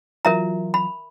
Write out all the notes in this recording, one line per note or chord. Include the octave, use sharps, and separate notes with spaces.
E3 F#3 F4 A#4 E5 A#5
B5